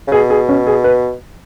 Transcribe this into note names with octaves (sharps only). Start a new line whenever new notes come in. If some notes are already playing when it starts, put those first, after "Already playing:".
C#3
B2 G#4
G#4
C#4
G#4
B4